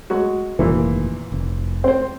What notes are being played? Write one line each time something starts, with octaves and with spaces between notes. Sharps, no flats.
F#3 G#3 F#4
F1 D#2 A#2 E3
F1
C4 C5